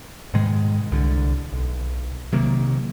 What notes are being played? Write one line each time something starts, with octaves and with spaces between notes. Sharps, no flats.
G#2 B2 D#3 G#3
C2 D3
B1
C3 D#3 F#3 A#3